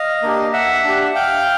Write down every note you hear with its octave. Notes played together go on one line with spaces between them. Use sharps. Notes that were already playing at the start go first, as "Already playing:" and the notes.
Already playing: D#5 F5
A#3 D4 G4
E5 F#5
D4 G4
F5 G5